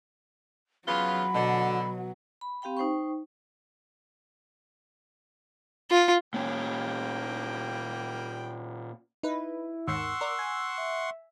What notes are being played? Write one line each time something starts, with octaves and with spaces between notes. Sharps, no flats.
C#3 F#3 B3 F4 B5
B2 D3
B5
C4 G4 F5 G5 B5
D#4 C5 G5 C#6
F4
A#2 G3 A#3 C#4 G5
D#4 E4 B4
D#2 G#2 D#3 F#5 C6 C#6 E6
A#4 D5
G#5
E5